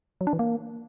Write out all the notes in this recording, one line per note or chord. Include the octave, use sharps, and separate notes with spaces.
F#3
D4
E3
A#3